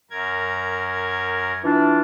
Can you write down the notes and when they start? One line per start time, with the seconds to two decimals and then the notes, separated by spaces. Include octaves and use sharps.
0.11 F#2 A#4 G#6
1.64 E3 D4 F4